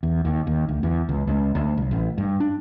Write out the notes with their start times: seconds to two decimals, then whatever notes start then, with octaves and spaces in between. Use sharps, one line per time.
0.03 E2
0.25 D#2
0.47 D#2
0.69 D2
0.83 E2
1.09 C#2
1.27 C#2
1.55 D2
1.78 C2
1.91 A1
2.18 G2
2.40 D4